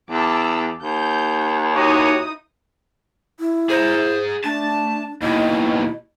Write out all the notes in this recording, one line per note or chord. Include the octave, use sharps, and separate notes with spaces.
E2 A5 D6 E6
D#2 G6
D#4 E4 F#4 G4 C#5 D#6
E4
G#4 C5 A#5
A3 D4 A5
D#2 B2 E4 D#5